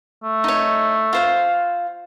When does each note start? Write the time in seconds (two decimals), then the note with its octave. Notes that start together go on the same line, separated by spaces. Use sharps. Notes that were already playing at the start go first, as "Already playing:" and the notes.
0.24 A3
0.44 D#4 C#5
1.13 F4 C5 F5